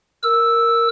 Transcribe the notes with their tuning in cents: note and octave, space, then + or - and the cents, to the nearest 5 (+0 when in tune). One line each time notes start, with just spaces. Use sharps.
A#4 +0 E6 +0